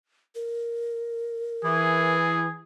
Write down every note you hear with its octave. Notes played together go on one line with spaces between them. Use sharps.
A#4
E3 G#4